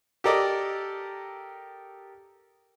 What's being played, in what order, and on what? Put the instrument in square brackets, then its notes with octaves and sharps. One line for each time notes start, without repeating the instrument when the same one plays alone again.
[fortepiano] G4 A4 A#4 D5 D#5